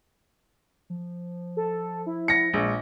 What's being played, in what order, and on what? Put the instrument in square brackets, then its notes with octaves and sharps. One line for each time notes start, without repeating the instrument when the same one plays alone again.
[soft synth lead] F3
[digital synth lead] A4
E4
[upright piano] A#6 C#7
[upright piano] A#1 [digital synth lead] G#3